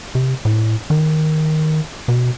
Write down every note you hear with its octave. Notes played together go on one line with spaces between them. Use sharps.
C3
A2
D#3
B2